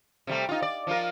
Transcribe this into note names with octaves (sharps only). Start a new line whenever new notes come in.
C3 G3 A3
D#4 F4
D5
F3 F4 A#4